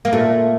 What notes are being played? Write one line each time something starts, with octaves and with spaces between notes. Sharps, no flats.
A#3
A#2 A3